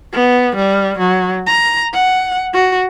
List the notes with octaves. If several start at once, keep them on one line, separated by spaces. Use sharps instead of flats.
B3
G3
F#3
A#5
F#5
F#4